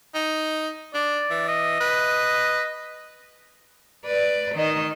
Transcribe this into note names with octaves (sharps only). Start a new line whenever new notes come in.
D#4
D4 D5
E3
D#5
B4
B4 D5
D#3 D#5